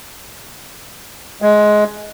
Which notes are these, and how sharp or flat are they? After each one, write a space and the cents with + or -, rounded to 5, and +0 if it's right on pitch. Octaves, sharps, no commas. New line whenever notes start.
G#3 +15